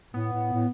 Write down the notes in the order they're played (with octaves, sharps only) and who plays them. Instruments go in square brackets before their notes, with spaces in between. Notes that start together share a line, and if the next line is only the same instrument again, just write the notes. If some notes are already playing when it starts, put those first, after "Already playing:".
[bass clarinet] A2 [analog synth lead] B3
[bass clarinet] A2
A2